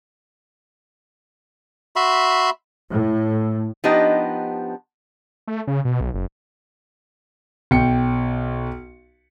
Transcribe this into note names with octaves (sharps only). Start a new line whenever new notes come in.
F#4 E5 B5 C6
A2
F3 B3 D4 D#4 G4 D#5
A3
C#3
B2
B1
F#1
B1 G5 C#7